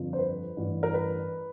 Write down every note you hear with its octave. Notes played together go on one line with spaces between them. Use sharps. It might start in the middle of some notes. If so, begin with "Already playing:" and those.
Already playing: G1 F2 D3 F3
C5
B4
A1 G2 E3
A#4
B4